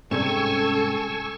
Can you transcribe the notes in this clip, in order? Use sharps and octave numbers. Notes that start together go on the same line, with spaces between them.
G#2 C3 G3 C#4 A4 G#5 C#6 E6